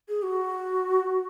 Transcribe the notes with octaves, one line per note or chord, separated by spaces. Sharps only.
G#4
F#4